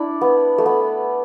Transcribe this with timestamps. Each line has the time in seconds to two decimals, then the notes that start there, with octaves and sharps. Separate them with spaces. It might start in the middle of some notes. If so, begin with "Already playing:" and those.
Already playing: D4 E4
0.21 B3
0.58 A3
0.66 B3